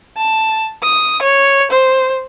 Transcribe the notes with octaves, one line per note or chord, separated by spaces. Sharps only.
A5
D#6
C#5
C5